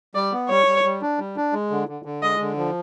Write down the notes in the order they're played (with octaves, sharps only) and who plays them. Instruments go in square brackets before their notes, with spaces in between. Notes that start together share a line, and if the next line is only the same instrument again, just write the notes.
[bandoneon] G3 [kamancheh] D5
[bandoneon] B3
[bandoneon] G3 [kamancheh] C#5
[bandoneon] G3
G3
D4
G3
D4
G#3
D3
D3
D3
[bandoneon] G#3 [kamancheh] D#5
[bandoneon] D3
F3